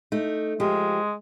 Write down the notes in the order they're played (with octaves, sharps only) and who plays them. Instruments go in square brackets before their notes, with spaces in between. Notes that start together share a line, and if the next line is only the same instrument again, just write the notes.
[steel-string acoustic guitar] A3 D#4
[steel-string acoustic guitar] F3 G4 [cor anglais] G#3